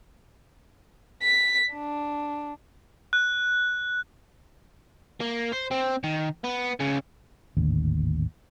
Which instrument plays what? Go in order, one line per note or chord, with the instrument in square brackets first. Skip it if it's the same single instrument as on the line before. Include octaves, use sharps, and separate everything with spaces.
[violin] B6
D4
[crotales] F#6
[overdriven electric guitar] A#3
C5
C4
D#3
B3
C#2 C#3
[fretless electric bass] G#1 D#2 A2 D3